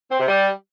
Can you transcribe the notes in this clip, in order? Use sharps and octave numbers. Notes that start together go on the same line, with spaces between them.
C4
C3
G3